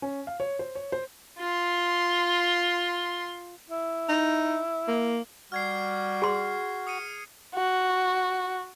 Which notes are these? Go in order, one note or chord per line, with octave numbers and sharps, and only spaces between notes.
C#4
F5
C#5
C5
C#5
C5
F4 C6
E4
D#4
A#3
G3 F#4 F6 G#6 C7
G#4 C6
D#6 C#7 D#7
F#4